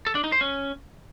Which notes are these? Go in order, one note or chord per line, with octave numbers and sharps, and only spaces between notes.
A4
D4
D#4
C5
C#4